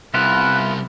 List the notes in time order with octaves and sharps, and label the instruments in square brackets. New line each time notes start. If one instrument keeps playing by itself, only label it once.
[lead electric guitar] C2 [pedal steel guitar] B3 E4 F4 [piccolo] F#6